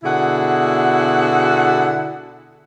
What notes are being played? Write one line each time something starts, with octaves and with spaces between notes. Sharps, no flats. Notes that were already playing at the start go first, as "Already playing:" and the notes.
B2 D3 E4 F#4 G#4 F#5